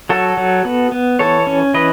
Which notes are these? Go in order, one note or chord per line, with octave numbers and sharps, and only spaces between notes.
F#3 F#4 A4
F#3
B3
B3
E3 A4 C#5
C#4
E3 B4 D#5